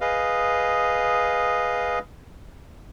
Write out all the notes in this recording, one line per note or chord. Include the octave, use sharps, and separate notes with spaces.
G#4 B4 D#5 F5